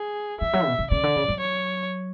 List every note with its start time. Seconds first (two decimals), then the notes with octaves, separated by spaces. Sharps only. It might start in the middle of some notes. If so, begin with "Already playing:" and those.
Already playing: G#4
0.41 E3 E5
0.53 F#3
0.66 B2
0.79 C#3
0.91 C#3 D5
1.03 D3
1.16 C#3
1.28 F#3
1.41 C#5